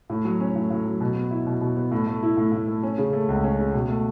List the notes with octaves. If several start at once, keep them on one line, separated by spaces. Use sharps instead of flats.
A2
F#3
C#4
A2
A2
F#3
B2
B3
E4
B2
B2
B3
A2
A3
E4
A2
A2
A3
C#4
C#3
A3
C#2
C#4
C#3
B2
A3